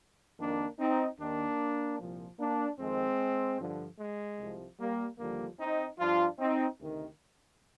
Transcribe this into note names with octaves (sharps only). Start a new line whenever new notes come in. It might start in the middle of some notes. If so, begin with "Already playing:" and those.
F2 D#3 A#3 D4
C4 D#4
D#2 D#3 A#3 D4
C2 A#2 F3
A#3 D4
F2 D#3 G#3 C4
G2 D3 F3
G#3
C2 C3 F3
G3 A#3
D#2 D3 F3 G3 A#3
C4 D#4
G2 F3 D4 F4
C4 D#4
D2 C3 D#3